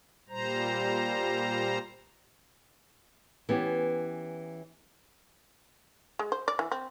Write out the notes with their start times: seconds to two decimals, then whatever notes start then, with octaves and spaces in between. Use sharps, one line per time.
0.29 A#2 G3 C5 A#5
3.49 E3 B3 C#4 G4
6.19 G#3
6.32 C5
6.48 D5
6.59 E3
6.72 C4